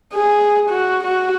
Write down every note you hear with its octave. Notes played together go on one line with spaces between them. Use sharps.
G#4
F#4
F#4